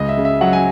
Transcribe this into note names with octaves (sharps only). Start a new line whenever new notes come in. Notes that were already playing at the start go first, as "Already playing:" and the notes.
Already playing: C#2 D#5
E5
C#3
E5
F#3 F#5
G#5